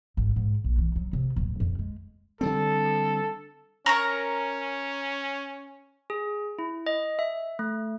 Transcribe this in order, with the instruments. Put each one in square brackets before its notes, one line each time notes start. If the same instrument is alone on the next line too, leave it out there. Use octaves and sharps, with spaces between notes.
[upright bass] G#1
G#2
A#1
E3
F#3
C3
D1
F2
G#3
[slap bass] D3 G3 C4 [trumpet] A4
[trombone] C#4 [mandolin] A#4 C#5 A#5
[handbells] G#4
E4
D#5
E5
A3